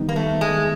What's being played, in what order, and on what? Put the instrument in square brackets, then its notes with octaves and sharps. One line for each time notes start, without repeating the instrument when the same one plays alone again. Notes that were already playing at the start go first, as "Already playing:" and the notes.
Already playing: [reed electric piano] D#3 G3 B3 D#4
[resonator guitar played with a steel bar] A#3
A3
G#3